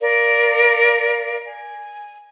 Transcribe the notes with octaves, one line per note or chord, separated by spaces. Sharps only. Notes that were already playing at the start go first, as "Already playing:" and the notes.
A#4 D5 F5
G#5